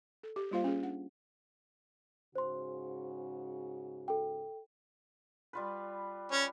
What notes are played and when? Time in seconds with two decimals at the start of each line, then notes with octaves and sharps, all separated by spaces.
0.23 A4
0.36 G4
0.51 G3 A#3 F4 C5 F5
0.64 C#4 G#4
0.83 D4 F#5
2.35 G#2 C#3 F#4 C5 C6
4.08 A4 G5
5.53 G3 F4 B4
6.32 C#4 B4